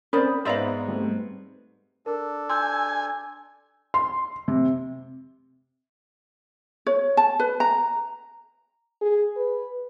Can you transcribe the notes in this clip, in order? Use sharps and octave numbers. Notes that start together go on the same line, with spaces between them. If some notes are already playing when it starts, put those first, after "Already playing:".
C4 C#4 A#4 C5 D5 B5 D#6
G#2 B3 C5 D5 E5 F5 A#5 F#7
G3 A3 C4
D4 A4 A#4
G#5 C6 E6 G6
C6
C3
C#5
A5
B4
A#5
G#4
B4